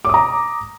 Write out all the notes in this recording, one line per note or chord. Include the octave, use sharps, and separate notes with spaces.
A#5 D6 D#6